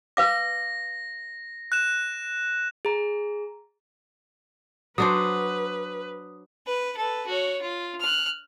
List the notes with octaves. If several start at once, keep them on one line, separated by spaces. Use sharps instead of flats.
B4 F5 D6 A#6
F#6 E7
G#4 A#5
F#3 D4 B4 C5 D#6
B4
A4 B4
F#4 C#5
F4
F6 F#6